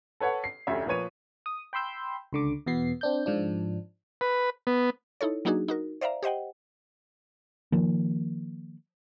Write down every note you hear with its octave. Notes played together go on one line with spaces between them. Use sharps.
A4 B4 C#5 F#5
C7
F1 D2 C#4 E5
A#2 F3 B4 C#5 D#7
D#6
G5 B5 C6 E6 G6
C#2 D3 D6
E2 B2 B3 C7
C4 D4 G6
G#2 F3 D4
B4
B3
D#4 E4 A4 C#5
F#3 A#3 D4 D#4 F#4 G#4
D#4 F#4 A#4
C5 D5 E5 F5 A#5
G4 C5 D#5 F#5 G5
D#3 F3 A#3